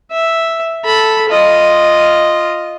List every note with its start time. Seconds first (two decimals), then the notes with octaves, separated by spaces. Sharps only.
0.11 E5
0.85 A4 B5
1.29 F4 D#5